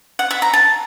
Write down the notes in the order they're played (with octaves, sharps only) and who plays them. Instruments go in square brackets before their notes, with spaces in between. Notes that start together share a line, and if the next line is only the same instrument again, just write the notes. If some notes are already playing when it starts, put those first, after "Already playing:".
[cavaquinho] F#5
E5
A#5
A5